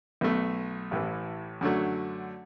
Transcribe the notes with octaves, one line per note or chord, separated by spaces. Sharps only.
B1 B2 A3
A1 A2 E3
F#2 D3 F#3 A3